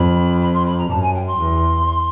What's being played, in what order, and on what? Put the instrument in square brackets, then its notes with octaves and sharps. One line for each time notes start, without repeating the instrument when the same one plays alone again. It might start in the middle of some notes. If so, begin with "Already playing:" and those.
Already playing: [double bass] F2 [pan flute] B5
[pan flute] B5
C6
B5
A#5
[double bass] F#2 [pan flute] A5
[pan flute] G#5
G5
C6
[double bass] E2